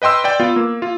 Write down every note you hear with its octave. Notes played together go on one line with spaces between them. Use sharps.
B4 D#5 G5 C6 E6
D5 G5
B3 F4
A#3
F4